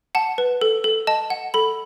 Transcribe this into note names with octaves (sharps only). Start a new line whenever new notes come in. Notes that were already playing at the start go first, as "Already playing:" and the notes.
F#5 A5
B4
A4
A4
D#5 A5
F#5
A4 B5